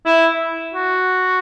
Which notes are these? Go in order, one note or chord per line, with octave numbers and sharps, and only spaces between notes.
E4
F#4